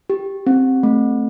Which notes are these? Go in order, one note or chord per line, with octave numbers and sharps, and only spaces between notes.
G4
C4
A3